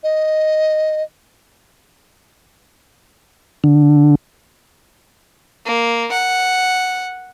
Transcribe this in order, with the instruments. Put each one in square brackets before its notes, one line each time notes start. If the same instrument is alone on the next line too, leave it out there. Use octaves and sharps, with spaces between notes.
[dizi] D#5
[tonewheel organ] D3
[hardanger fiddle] A#3
F#5